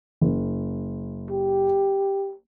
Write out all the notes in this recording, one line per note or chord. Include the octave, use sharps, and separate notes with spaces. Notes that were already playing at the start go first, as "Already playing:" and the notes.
F#1
G4